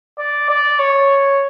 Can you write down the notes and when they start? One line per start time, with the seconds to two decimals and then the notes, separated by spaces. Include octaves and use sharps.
0.19 D5
0.49 D5
0.79 C#5